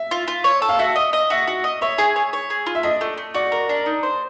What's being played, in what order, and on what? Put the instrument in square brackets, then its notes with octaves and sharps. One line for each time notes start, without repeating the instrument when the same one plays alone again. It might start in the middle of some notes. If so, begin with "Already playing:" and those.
Already playing: [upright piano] E5
[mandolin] F4
F4
C#5
A4
[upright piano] F5
[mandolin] F#4 [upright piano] E5
[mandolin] D#5
D#5
[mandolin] F#4 [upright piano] E5
[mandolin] F#4
D#5
[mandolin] C#5 [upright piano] E5
[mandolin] G#4
C#5
C#5
G#4
F4
[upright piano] E5
[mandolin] D4 [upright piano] D#5
[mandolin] A3
A3
[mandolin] F#4 [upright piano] D5
[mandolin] A#4
D4
D#4
C5